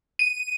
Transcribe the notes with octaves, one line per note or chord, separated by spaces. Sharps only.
D#7